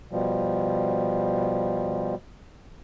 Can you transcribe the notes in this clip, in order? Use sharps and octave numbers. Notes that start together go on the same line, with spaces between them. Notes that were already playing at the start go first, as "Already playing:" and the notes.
B2 F3 G3